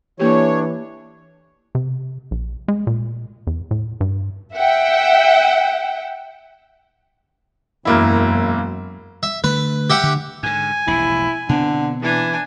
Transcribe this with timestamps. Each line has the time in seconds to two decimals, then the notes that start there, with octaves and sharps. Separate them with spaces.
0.20 E3 A#3 D4 G4 A4 C#5 C#6
1.75 C3
2.31 A#1
2.68 G#3
2.87 A#2
3.47 E2
3.71 A2
4.01 G2
4.54 E5 F#5 G5
7.85 E1 F#2 A#3 E4
9.23 E5
9.44 D3 A3 B4
9.90 G4 E5 F#5
10.04 D3
10.43 G#2 D3 G#5
10.87 E1 A#1 C3 E4
11.49 B2 D3 B3 C4
12.02 E3 D4 G#5